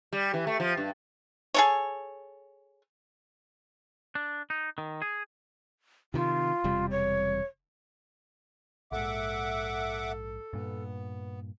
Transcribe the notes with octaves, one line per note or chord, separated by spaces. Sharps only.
G3
E3
A3
F3
G2
G#4 A4 C#5
D4
D#4
D#3
G#4
C3 D#3 F4
E1 C3 G3
C#5
A#1 G#2 A4 E5 F#5 D6
G2 A#2 B3